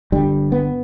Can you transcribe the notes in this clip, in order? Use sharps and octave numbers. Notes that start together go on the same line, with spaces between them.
G1 G2 D3 G3
B3